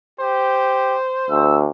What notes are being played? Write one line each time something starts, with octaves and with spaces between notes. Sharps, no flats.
G4 C5
D2 E6